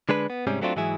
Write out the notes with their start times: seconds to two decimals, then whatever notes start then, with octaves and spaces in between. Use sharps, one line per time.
0.09 D3 G#3 D4 B4
0.30 B3
0.47 G#2 C3 G3 C#4
0.61 F#3 A3 C4 D4 F4
0.76 G#2 E3 F#3 E4 G#4